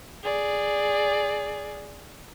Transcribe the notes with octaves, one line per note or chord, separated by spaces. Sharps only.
G#4 D5